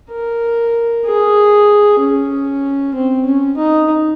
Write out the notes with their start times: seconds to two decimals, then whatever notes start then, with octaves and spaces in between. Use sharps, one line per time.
0.12 A#4
1.06 G#4
2.00 C#4
2.94 C4
3.26 C#4
3.57 D#4